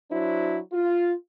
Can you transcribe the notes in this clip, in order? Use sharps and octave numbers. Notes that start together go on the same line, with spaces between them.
F#3 D4 E4 F#4 C5
F4